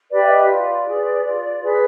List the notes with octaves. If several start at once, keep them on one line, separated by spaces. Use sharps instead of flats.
G4 B4 D5
E5
D#5
F4 D5
G#4 B4
F4
G#4 B4